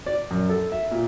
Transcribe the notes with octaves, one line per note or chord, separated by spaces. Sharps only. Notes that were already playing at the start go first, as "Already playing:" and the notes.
D5
F#2
A4
E5
A#2